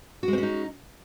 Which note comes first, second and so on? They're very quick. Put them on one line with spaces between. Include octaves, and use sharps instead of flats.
F#4 G#3 C4 C#4 D#4